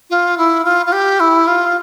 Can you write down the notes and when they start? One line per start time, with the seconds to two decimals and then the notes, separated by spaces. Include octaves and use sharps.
0.10 F4
0.38 E4
0.65 F4
0.86 F4
0.92 G4
1.20 E4
1.47 F4